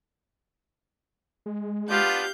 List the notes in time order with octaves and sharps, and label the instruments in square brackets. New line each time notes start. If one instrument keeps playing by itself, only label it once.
[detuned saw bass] G#3
[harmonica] B3 D4 F4 [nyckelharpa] G4 F5 [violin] G6